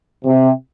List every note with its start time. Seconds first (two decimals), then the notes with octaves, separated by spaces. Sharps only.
0.25 C3